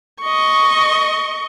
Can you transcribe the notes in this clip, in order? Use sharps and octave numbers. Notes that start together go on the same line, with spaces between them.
D#5 C#6